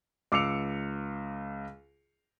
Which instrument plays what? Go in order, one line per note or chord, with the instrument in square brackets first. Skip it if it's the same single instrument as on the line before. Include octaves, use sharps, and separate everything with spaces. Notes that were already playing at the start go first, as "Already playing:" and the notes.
[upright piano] C#2 D6 E6 C7 C#7 F7